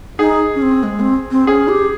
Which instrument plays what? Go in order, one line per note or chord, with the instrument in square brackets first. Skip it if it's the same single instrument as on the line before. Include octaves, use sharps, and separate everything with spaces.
[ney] D#4 [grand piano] G#4
[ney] C#4
C4
G#3
C4
C4
[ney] C#4 [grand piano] G#4
[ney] G4